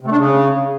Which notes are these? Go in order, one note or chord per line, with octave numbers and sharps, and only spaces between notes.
C3
A3
D4
C#3